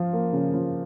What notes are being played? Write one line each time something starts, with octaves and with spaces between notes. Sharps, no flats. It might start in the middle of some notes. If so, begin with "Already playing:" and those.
Already playing: F3 F4
A#3
C#3
F3